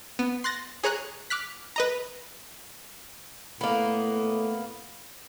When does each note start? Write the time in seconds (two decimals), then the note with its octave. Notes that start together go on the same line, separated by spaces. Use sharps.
0.19 B3
0.44 C6 F#6 A6 A#6
0.84 G#4 C#5 A#5 F#6
1.30 D6 F6 F#6 B6
1.76 B4 D#5 A#5
3.61 A2 A#3 B3